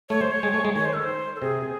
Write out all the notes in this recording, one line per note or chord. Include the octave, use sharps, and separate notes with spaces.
A3 C#5
C5
C#5
G#3
A3
G#3
D#3 C#5
C5
A4
C5
A4
C3 G#4